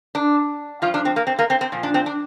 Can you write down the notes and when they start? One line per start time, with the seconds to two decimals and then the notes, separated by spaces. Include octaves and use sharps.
0.15 D4
0.82 G2 F3 F4
0.94 D4
1.05 C4
1.16 A#3
1.27 C4
1.39 A#3
1.50 C4
1.61 C4
1.72 A#2 F3
1.83 D4
1.94 C4
2.06 D4